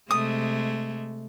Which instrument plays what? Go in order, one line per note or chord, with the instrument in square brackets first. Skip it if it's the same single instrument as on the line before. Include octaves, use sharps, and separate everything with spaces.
[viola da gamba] C3 G#3 A3 [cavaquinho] D#6